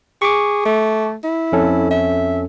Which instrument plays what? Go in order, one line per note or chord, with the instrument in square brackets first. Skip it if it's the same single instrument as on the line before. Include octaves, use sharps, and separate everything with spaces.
[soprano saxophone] G#4 [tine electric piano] C#6 D6
[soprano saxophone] A3
E4
[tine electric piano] F2 C#4 A4
[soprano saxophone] E5